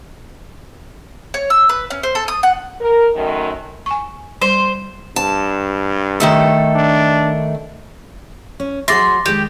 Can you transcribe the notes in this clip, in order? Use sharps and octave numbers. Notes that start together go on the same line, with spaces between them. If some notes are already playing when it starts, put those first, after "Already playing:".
C#5
E6
B4
C#4
C5
A4
D#6
F#5
A#4
F#2 D#3 A3
G#5 C#6
G3 C5
G2 A5
D#3 A3 A4
D4
C#4
F#3 G#4 E5 C6 D6 A6 A#6
D#3 G#3 G4